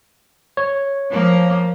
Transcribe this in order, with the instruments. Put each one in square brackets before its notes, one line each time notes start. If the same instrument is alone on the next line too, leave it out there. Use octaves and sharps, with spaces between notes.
[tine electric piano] C#5
[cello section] F3 A#3